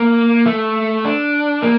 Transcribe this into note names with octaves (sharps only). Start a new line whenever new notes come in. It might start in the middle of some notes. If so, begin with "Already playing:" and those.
Already playing: A#3
A3
D4
A#3